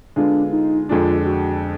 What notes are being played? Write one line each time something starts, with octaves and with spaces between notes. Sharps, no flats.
D3 G#3 B3 D4 F4
D#4
F2 D3 G#3 D4 F4
F#4